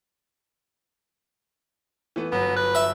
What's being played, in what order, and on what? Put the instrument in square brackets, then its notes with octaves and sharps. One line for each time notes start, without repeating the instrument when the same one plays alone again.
[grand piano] E3 A3 B3
[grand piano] G1 F#3 [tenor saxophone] B3
[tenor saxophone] B4
[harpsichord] E5